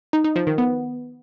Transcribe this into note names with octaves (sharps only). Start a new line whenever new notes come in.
D#4
D#4
F3
D#3
B3